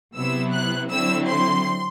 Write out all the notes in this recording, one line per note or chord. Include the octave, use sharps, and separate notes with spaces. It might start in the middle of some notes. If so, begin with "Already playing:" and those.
C3 F#3 B3 E4 E6
F#6
D3 F#3 C4 E4 E6
C6